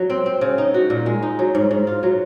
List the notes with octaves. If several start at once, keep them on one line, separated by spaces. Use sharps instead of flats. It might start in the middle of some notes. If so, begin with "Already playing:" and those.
Already playing: F#3
C4
C4
C#3
D#4
F#4
A#2
G#3
D#4
F#3
G#2
G#2
F4
F#3